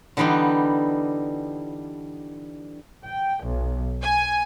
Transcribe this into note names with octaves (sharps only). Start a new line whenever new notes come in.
D3 E3 G3 B3 D#4
G5
B1
G#5